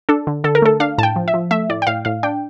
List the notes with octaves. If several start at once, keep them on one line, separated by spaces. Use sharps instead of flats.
D4 A4
D3
D3 A4
A#4
A3 A4
D4 F5
A2 A5
G5
F3
E5
F3
A3 E5
A2 D5
G5
A2 F5
A2 F5
D4 G5